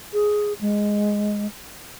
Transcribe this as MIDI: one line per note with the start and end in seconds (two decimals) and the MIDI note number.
0.13 0.53 68
0.61 1.47 56